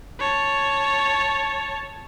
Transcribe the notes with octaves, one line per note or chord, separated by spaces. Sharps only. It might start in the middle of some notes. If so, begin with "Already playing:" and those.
C#5 A5